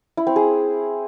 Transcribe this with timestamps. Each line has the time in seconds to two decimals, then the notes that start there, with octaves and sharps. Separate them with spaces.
0.17 E4
0.27 C4
0.36 G#4